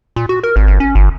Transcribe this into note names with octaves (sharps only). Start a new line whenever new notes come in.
A#2
F#4
A#4
G#1
G1
C#4
G1